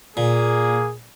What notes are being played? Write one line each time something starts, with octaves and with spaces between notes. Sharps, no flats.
A#2 A#3 G#4